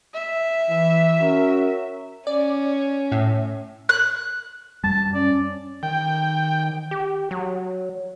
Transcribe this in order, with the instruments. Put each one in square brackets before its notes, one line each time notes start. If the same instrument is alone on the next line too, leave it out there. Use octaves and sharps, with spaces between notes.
[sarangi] E5
[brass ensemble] E3
C#4 F#4 A#4
[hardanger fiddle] C#4 [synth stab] D5
[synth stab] A2
[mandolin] F#6
[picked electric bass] F#2 G3 [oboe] A5
[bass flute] C#4 [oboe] D5
[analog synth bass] D#3 [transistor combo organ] G5
[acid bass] G4
F#3